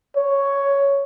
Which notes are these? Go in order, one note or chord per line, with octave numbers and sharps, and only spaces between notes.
C#5